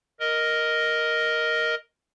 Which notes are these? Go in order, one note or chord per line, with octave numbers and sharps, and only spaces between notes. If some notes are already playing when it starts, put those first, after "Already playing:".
A#4 D#5